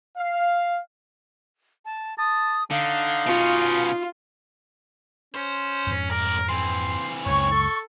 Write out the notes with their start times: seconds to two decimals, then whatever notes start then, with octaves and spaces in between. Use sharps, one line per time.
0.18 F5
1.85 A5
2.18 A5 D#6
2.71 D3 D#4 F5
3.26 B2 C#4 F4
5.35 C#4 C5
5.87 F2 G#2
6.11 C2 A#4 D5
6.49 E3 C4 C6
7.26 C#2 F#2 C#5 C#6
7.52 A4